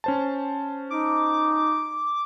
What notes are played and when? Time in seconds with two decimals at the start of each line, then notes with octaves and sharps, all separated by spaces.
0.04 C#4 C5 A5
0.90 D#4 D6